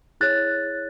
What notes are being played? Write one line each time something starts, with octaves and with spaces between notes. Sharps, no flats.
E4 G#4 C#5 F#6 A6